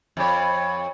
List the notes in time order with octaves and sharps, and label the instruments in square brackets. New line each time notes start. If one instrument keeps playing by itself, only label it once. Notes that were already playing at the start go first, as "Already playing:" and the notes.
[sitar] F2 C#5